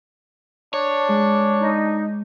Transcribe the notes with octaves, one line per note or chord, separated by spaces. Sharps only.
D4 C#5
G#3
D#4